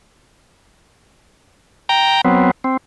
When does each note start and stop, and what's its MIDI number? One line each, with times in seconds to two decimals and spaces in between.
1.89 2.21 79
1.89 2.21 82
2.25 2.51 54
2.25 2.51 59
2.25 2.51 60
2.64 2.77 60